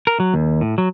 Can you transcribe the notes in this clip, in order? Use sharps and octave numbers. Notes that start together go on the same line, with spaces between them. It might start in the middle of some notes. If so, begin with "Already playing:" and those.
A#4
F#3
D#2
A2
F#3